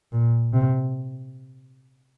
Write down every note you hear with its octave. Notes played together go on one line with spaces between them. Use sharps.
A#2
C3